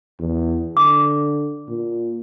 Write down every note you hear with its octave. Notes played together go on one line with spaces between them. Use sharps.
E2
D3 D6
A#2